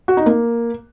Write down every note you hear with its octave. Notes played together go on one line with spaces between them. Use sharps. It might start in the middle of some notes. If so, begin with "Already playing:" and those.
F#4
D#4
A#3